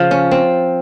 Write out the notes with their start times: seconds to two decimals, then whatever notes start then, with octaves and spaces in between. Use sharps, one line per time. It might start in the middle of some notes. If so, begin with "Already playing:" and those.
Already playing: C#3 F3
0.11 C#4
0.31 C4